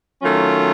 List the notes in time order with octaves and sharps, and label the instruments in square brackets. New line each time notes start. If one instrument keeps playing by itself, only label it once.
[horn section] D#3 F#3 A3 C#4 F4